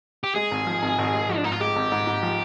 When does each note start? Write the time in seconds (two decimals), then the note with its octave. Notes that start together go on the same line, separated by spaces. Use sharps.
0.24 G4
0.35 G#3 G#4
0.51 G#1
0.67 F3
0.82 G#1
0.98 G#1
1.14 G#3
1.29 F3
1.36 D4
1.44 G#2 D#4
1.52 F4
1.60 G#3 G4
1.76 G#1
1.92 G#2
2.07 G#2
2.23 F3